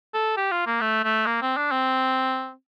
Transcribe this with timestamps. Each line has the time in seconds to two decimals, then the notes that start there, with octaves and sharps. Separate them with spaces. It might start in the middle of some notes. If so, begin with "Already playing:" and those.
0.14 A4
0.37 G4
0.52 F4
0.67 A#3
0.81 A3
1.05 A3
1.26 A#3
1.42 C4
1.57 D4
1.72 C4